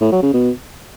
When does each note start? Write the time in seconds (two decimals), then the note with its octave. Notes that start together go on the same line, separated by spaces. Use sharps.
0.01 A2
0.12 F#3
0.23 C#3
0.33 B2